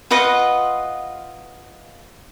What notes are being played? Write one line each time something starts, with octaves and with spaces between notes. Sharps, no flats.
F4 B4 D#5 F#5